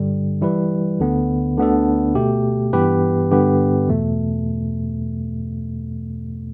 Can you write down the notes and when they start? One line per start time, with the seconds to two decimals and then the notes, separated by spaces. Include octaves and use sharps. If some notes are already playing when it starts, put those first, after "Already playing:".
Already playing: G2 D3 G3
0.41 E3 G3 E4 B4
1.00 D2 D3 B3
1.58 D2 D3 B3 D4 A4
2.15 B2 A3 G4
2.73 G2 E3 B3 G4 B4
3.31 G2 D3 B3 G4 B4
3.88 E2 B2 A3